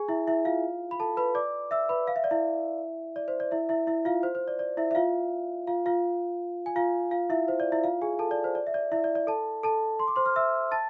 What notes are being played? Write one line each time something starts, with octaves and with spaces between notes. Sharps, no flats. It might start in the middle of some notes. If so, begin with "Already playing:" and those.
Already playing: G#4 G#5
E4 E5
E4 E5
F4 F5
B5
A4 A5
B4 B5
D5 D6
E5 E6
B4 B5
F5
E5
D5
E4 E5
D5
C5
D5
E4 E5
E4 E5
E4 E5
F4 F5
C5
C5
D5
D5
E4 E5
E5
F4 F5
F4 F5
F4 F5
G#5
F4 F5
F4 F5
E4 E5
C5
D5
E4 E5
F4 F5
G#4 G#5
A4 A5
D5
C5
D5
E5
D5
E4 E5
D5
D5
A4 A5
A4 A5
C6
D6
C5 C6
F6
E5 E6
A5 A6